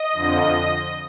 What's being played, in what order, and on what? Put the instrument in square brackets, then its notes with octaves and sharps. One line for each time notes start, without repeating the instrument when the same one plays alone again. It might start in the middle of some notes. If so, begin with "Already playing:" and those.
Already playing: [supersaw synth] D#5
F2 D3 F3